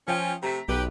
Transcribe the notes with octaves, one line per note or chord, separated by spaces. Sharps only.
F3 C#4 F4 G5 G#5
C3 A3 A#5 B6
B1 G4 B4